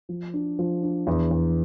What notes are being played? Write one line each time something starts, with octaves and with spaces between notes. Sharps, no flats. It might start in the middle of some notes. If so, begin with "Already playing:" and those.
F3
D4
F3
D4
E2
E2